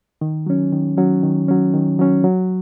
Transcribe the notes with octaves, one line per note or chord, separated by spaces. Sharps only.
D#3
F#3 C#4
D#3
F#3 C#4
D#3
F#3 C#4
D#3
F#3 C#4
F#3